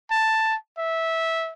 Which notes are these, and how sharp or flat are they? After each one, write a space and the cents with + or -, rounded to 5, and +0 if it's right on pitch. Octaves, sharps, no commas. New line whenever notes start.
A5 +5
E5 -15